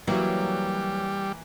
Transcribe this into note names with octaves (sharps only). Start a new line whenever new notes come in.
E3 F#3 G3 A#3